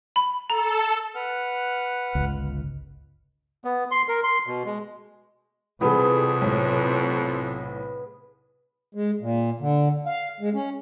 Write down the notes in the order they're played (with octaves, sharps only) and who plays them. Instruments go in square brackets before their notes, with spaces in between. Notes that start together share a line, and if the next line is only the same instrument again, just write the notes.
[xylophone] B5
[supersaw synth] A4 [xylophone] A#5
[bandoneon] B4 F#5 F6
[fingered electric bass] G1 C#2
[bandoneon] B3
C6
A#4
C6
B2
G#3
[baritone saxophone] F2 [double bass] C3 [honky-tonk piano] E3 G3 A4 [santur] B3 G#4
[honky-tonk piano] B1 A2
[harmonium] G#3
A#2
D3
F5
G#3
C#4